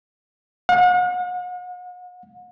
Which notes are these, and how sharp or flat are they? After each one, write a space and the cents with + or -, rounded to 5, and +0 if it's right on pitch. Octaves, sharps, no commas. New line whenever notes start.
F#5 -40